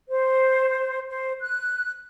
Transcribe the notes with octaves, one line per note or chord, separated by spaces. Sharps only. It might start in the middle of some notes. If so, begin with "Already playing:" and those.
C5
C5
F#6